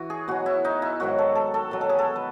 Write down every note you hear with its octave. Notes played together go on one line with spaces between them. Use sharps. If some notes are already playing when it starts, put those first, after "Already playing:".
Already playing: E3 F#4
G#4
B2 F#3 F#4
E4
D#4
E4
G#2 D#3 F#3 F#4
A4
A4
A4
B2 F#3
A4
G#4
A4
B4